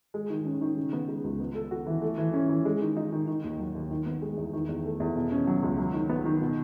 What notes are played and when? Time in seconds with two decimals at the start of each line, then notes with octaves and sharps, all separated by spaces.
0.14 G#3
0.30 D#3
0.45 C#4
0.61 D#3
0.77 C#3
0.93 B3
1.08 G#3
1.24 C#2
1.40 B3
1.55 A4
1.71 F#4
1.86 E3
2.02 A3
2.18 E3
2.34 C#4
2.49 E3
2.65 G#3
2.81 D#3
2.97 D#4
3.12 D#3
3.27 D#3
3.44 D#2
3.59 F#3
3.75 D#2
3.91 D#3
4.06 B3
4.22 G#3
4.37 E2
4.53 D#3
4.69 E2
4.84 A3
5.00 E2
5.16 B2
5.32 C#4
5.47 F#3
5.63 C#2
5.78 F#3
5.94 D#3
6.09 B3
6.25 D#3
6.42 B2